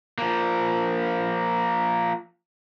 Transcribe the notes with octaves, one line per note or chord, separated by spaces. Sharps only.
F3 A#3